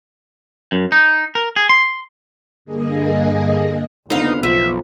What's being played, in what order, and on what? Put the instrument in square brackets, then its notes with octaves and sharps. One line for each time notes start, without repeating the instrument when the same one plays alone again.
[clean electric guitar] F#2
D#4
A#4
G#4
C6
[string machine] G2 D3 A#3 G#4 D#5
[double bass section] F#1 F2 B3 [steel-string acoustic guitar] D3 F5 [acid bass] D#4
[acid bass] B1 [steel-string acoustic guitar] F3 [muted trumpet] E5